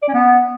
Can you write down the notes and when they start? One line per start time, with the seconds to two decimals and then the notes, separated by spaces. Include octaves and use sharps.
0.03 D5
0.08 C#4
0.14 B3